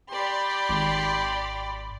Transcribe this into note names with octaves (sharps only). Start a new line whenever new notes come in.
G4 D5 B5 C6
G#1